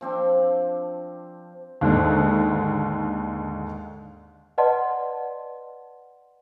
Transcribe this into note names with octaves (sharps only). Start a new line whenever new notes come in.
F3 C4 D4
D#2 G#2 D3
B4 D5 D#5 F#5 A5 C6